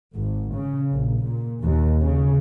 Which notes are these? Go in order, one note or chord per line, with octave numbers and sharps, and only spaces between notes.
G#1
C#3
A#1
A#2
D#2
C#3